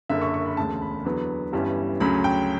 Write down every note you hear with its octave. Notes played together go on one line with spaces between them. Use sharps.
F#1 F#2 D3 E5
C#6
C#6
B5
E1 D2 C#3 A5
B5
E2 D3 F#3 B3
G1 G2 E3 G3 C#4
D2 C#3 F#3 C#4 B5
G5